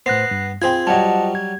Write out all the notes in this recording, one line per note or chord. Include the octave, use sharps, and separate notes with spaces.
A2 B3 C5 F#6 A#6 C7
G2
C4 F4 G#4 C5 G5 B5 G#6
F#3 G3 D#5 F#5 A5
G#6